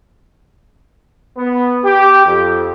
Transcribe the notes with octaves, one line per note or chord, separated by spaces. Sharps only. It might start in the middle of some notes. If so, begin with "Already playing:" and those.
B3
G4
F2